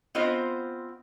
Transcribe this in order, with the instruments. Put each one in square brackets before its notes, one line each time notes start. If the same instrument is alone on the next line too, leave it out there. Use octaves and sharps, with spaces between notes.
[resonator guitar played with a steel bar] B3 C4 F4 C5 D#5